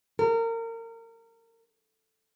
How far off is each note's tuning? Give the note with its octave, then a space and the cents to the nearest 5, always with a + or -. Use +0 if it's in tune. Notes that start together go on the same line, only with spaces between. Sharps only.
A#4 -30